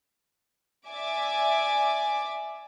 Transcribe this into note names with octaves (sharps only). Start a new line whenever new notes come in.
D5 E5 G#5 D6